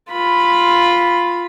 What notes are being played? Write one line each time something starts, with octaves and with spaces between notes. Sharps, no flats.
F4 B5